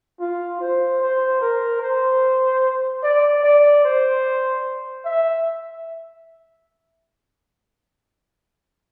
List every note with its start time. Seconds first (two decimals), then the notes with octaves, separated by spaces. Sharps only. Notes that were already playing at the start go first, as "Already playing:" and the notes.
0.20 F4
0.61 C5
1.01 C5
1.41 A#4
1.82 C5
3.03 D5
3.44 D5
3.84 C5
5.06 E5